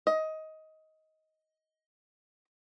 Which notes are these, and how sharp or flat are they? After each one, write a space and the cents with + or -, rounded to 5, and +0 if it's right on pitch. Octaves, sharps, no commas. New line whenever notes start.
D#5 +15